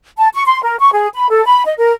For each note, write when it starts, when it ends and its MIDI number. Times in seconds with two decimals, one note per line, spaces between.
0.17 0.28 81
0.34 0.43 85
0.47 0.62 84
0.63 0.76 70
0.80 0.91 85
0.93 1.08 68
1.14 1.30 83
1.30 1.44 69
1.45 1.63 83
1.66 1.73 75
1.78 1.92 70